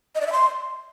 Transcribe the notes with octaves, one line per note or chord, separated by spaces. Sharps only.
D#5
D5
E5
C6